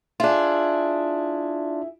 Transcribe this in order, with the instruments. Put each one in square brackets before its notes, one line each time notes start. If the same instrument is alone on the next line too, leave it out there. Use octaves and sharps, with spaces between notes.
[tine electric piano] D4 F4 [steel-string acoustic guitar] E4 G#4